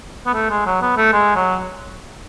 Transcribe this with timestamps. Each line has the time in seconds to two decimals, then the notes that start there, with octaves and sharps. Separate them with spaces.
0.27 B3
0.34 A3
0.50 G#3
0.66 F#3
0.82 B3
0.97 A3
1.13 G#3
1.36 F#3